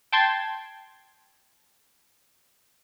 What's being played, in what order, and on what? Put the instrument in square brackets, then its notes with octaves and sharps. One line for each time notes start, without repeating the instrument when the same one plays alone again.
[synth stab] G5 A5 C6 G#6